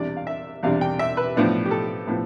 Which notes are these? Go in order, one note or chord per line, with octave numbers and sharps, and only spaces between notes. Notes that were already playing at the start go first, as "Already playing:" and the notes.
Already playing: E2 C3 G3 D4 D5
F5
E5
E2 C3 G3 D4 F5
G5
E5
B4
A2 F3 B3 D4
G4
A4
A2 F3 B3